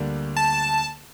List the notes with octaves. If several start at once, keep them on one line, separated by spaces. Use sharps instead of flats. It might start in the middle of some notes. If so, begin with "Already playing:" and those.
Already playing: D2 D3 G3 A#3 D4
A5